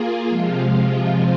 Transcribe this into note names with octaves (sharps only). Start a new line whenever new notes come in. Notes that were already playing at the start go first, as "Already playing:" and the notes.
Already playing: A#3 F4 G#4
C3 F3 G#3 F4